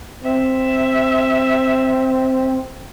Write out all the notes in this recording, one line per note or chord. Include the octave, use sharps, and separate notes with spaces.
C4 E5